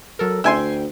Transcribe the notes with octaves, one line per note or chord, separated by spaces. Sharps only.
F#3 A4 A#4
D2 E5 G5 G#5 C6